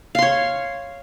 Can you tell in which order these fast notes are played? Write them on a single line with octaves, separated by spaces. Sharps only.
F5 C6 C#5